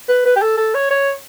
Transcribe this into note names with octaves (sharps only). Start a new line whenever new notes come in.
B4
B4
G4
A4
A4
C#5
C#5